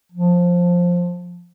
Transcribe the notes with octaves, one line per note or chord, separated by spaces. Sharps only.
F3